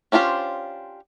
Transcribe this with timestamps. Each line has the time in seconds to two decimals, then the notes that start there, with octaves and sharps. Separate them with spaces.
0.12 C#4 D4 F4 G4 C5